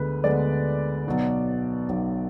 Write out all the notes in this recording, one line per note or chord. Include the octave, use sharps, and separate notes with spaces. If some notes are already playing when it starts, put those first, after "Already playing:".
Already playing: D2 D3 G#3 B3 B4
D2 D3 G#3 B3 D5
B1 B2 F#3
B1 B2 F#3